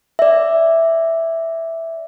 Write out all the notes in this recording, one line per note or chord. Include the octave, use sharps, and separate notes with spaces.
D5 E5